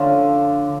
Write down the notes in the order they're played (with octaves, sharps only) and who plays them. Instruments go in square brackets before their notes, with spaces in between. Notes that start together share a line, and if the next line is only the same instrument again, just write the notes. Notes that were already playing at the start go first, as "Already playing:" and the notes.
Already playing: [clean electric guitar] D3 [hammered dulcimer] F3 A3 C#4 F4